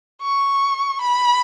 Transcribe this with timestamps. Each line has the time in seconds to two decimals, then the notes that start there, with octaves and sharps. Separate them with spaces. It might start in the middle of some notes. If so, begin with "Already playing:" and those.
0.22 C#6
1.01 B5